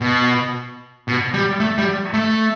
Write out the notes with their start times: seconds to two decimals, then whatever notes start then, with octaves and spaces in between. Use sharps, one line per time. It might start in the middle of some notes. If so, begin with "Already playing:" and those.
0.01 B2
1.08 B2
1.34 G3
1.60 A3
1.78 G3
2.14 A3